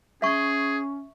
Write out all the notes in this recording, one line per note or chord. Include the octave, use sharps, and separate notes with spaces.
C#4 G#4 E5 C#6